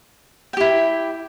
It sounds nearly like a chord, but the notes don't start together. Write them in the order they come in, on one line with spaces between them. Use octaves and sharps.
G5 G4 E4